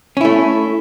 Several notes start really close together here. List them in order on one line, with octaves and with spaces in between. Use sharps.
C#4 E4 A3